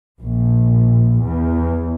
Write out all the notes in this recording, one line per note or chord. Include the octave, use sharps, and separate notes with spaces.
A#1
E2